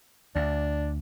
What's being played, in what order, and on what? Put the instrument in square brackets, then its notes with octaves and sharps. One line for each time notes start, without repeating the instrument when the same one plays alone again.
[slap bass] D2 [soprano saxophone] D4